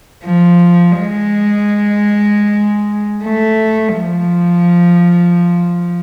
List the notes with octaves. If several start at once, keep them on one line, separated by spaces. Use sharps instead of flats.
F3
G#3
A3
F3